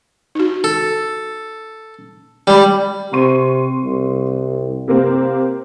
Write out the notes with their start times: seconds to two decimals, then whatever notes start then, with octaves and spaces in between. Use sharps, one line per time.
0.35 D#4 F#4
0.64 A4
2.47 G3 G#3 D5 B5
3.13 C3 C6 C#6 D#7
3.84 C2
4.88 C3 A#3 C4